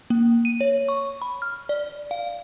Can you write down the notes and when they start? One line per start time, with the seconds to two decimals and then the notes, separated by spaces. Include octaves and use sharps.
0.10 A#3
0.45 D#7
0.61 C#5
0.88 C#6
1.22 B5
1.42 F6
1.69 D5
2.11 F5